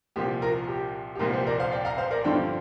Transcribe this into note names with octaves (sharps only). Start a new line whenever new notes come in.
C2 A#2 F3 G4
F4 A#4
G4
G4
C2 A#2 F3 F4 A#4
G4 C5
A#4 D5
C5 F5
D5 G5
F5 A#5
C5 F5
A#4 D5
G2 D3 F3 D5 G5